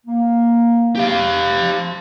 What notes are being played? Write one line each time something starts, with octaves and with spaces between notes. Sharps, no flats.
A#3
G4 F5
F3